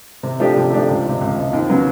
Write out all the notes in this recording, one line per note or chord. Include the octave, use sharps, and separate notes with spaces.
C3
F3 A3 D4 G4
C3
F3 A3 D4 G4
C#2
C3 F3
C#2
C3 F3
D#2
C#3 F#3 B3